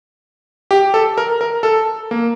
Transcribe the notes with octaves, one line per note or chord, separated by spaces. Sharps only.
G4
A4
A#4
A#4
A4
A#3